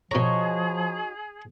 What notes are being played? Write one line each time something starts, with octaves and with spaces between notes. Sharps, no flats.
B2 F3 D#4 F#4 G#4 C#5 A#5